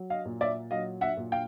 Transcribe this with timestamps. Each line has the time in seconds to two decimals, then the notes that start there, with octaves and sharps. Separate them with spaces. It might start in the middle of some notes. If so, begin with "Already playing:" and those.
Already playing: F#3
0.10 D#5 F5
0.25 A#2
0.41 D5 E5
0.71 F#3 D#5 F5
1.01 E5 F#5
1.17 A#2
1.32 F5 G5